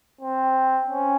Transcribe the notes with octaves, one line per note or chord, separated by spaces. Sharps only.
C4
C#4